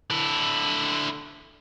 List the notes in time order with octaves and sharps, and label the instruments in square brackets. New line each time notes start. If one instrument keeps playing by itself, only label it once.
[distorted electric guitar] D3 E4